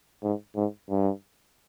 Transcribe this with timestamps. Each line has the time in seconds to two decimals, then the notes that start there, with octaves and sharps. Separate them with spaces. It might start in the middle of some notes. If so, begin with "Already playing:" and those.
0.23 G#2
0.56 G#2
0.90 G2